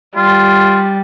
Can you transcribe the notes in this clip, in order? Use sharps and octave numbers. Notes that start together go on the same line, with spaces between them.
G3 F4